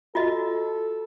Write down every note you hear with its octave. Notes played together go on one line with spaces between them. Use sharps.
F4 F#4 A4 D#5